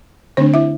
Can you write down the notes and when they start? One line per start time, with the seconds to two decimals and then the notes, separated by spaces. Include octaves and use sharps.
0.37 D3 A3 C4 D4 C5
0.54 E4 E5